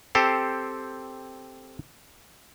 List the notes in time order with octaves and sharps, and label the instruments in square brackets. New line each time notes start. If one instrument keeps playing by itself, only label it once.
[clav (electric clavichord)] C4 G4 A4 C5